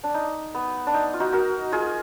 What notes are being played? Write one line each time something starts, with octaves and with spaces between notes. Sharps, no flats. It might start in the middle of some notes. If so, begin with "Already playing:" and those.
D4
D#4
B3
D4
D#4
F4
D#4 F#4
F#4 A#4
F4 G#4